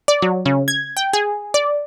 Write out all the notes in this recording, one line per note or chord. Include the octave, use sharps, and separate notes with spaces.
D5
F#3
C#3
G#6
G5
G#4
D5